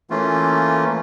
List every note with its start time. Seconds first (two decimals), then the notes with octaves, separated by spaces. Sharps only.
0.10 E3 A3 A#3 C#4 F4